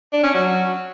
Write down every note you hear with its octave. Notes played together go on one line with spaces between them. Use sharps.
D4
C#4
F#3